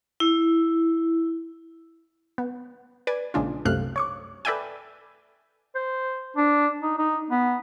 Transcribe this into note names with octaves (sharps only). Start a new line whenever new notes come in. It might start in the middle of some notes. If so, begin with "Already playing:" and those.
E4
B3
B4 D5 G#5
A#1 C#3 G#3 D4 F4
C2 F#2 C3 A3 F5 F#6
C#5 C#6 D6
A4 B4 D5 E5 G5 G#5
C5
D4
D#4
D#4
B3